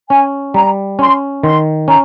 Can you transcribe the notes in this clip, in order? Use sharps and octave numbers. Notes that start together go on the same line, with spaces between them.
C#4 G#5
G3 A#5
C#4 C6
D#3 C6
C#4 A#5